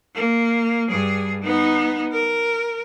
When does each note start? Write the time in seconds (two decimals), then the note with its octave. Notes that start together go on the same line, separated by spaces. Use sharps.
0.15 A#3
0.89 G2 G#4
1.43 B3 D#4
2.12 A#4